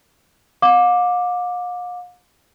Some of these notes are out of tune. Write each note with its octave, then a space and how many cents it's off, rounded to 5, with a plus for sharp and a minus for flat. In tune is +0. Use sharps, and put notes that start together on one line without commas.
F5 +45 D6 +0